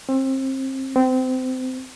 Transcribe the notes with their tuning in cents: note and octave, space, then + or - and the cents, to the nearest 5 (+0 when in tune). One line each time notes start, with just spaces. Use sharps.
C4 +30
C4 -25